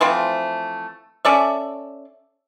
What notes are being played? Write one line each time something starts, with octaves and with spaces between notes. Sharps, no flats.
E3 F3 A3 C4
C#4 A4 D5 E5